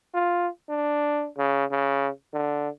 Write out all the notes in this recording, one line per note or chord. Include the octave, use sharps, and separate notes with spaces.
F4
D4
C#3
C#3
D3